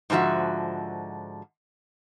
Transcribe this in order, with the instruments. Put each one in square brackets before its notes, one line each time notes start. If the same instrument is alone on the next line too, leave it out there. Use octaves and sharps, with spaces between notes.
[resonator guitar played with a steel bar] G#2 D3 F3 F#4 E5